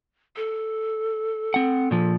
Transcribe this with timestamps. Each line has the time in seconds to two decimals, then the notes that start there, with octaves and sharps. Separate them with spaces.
0.36 A4
1.54 C4 F#5
1.91 A#2 F3